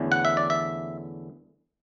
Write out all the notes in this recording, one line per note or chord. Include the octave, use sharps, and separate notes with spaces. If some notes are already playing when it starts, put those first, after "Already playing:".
Already playing: E2 D3 A3 C#4
F#5
E5
D5
E5